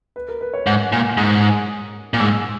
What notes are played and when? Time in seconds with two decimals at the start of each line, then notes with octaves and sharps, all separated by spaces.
0.16 B4
0.28 A#4
0.41 B4
0.54 C#5
0.67 G#2 F#5
0.92 A#2 G#5
1.17 G#2 D#6
2.14 A#2
2.20 G#2 E6